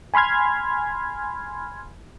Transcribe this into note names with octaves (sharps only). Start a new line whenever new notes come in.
G#5 B5 C6 F6 G#6